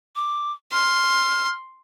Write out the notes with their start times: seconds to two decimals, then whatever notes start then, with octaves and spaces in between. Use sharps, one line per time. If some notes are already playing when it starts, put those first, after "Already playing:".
0.16 D6
0.72 C6 F6